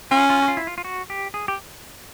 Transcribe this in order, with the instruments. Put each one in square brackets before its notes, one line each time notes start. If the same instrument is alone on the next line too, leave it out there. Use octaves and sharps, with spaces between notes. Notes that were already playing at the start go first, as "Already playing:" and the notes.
[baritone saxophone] C#4 [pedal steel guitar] F4
[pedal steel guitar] F4
F#4
F4
E4
F4
F4
F#4
G4
G#4
G4